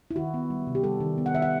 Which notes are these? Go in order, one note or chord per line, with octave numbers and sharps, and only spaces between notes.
E4
D#3 F#4
B3
G3
C3
G4
G3 A4
D#3
B3
F#5
D#3 E5
F#5